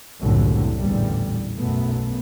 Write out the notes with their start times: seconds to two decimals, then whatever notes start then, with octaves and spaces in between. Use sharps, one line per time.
0.21 F#1 C2 A2 D3
0.80 A1 E2 A#2 D3 G3
1.58 B1 F#2 A3 B3